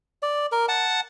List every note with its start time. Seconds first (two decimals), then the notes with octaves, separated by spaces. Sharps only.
0.23 D5
0.52 A#4
0.68 F#5 A5